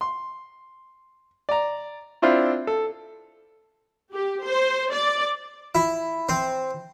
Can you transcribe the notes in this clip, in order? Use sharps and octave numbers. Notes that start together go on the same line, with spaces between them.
C6
D5 A#5
C4 D4 E4 F4 C5
A4
G4
C5
D5
E4
C4